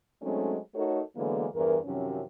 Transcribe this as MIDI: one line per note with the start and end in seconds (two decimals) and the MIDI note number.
0.22 0.57 54
0.22 0.57 56
0.22 0.57 57
0.22 0.57 60
0.22 0.57 61
0.22 0.57 63
0.75 1.00 57
0.75 1.00 63
0.75 1.00 66
0.75 1.00 69
0.75 1.00 70
0.75 1.00 73
1.16 1.46 50
1.16 1.46 52
1.16 1.46 54
1.16 1.46 56
1.16 1.46 58
1.16 1.46 59
1.54 1.77 40
1.54 1.77 43
1.54 1.77 52
1.54 1.77 70
1.85 2.22 42
1.85 2.22 48
1.85 2.22 51
1.85 2.22 53
1.85 2.22 54
1.85 2.22 61